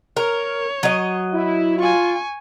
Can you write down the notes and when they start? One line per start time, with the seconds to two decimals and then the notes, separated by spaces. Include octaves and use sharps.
0.17 A#4 C#5
0.83 F#3 D#5
1.34 E4
1.78 F4 G#5 C#6